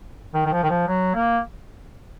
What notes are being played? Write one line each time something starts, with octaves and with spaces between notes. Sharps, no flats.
D#3
D#3
F3
D#3
F3
F#3
A#3